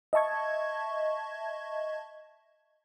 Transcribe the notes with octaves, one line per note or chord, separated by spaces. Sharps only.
D#5 E5 A5 C#6 G#6